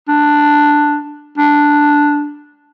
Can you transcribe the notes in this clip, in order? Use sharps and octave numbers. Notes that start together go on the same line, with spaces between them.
D4
D4